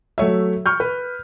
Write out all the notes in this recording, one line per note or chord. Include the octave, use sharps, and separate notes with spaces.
F#3 A3 C#5 E5
C#6 F6 G6
B4